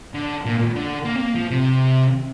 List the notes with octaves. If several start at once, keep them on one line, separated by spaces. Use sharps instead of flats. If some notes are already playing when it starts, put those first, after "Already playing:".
D3
A#2
D3
A#3
C4
A#3
F3
C3